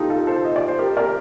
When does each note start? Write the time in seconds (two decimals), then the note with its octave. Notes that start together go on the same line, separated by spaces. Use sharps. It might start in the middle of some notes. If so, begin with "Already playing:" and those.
Already playing: D#4 F4 G4 A4
0.10 F4 A4
0.27 A4 C5
0.44 D#5
0.56 D5
0.68 C5
0.78 G4 A#4
0.97 A#4 D5